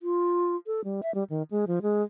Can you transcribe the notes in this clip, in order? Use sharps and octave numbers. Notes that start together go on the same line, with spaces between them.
F4
A4
G3
E5
G3
D#3
G#3
F3
G#3